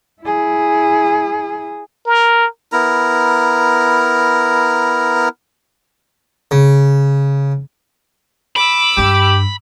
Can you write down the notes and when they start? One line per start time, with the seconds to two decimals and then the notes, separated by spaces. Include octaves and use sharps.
0.22 E4 G#4
2.06 A#4
2.72 B3 E4 A#4 A#5
6.51 C#3
8.56 B5 D6 E6
8.97 G2 D4 G4